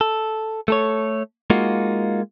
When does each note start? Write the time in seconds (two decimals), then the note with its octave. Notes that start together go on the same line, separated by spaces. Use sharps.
0.01 A4
0.68 A3 A4 C#5
1.50 G#3 A#3 D#4 F4 F#4